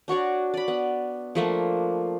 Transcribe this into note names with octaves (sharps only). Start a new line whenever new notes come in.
D4 F#4 C#5 D5
D5 B5
B3
F3 A3 A#3 D4